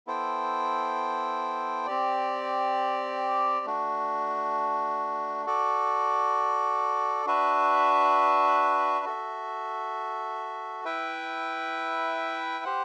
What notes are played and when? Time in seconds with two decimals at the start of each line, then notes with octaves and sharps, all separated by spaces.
0.07 B3 E4 A4 C5 G5
1.86 C4 G4 D5
3.66 A3 D4 F#4
5.46 F#4 A4 D5
7.26 D4 F#4 B4 E5
9.05 F#4 A4 E5
10.85 E4 B4 E5 G5
12.64 G4 C5 F#5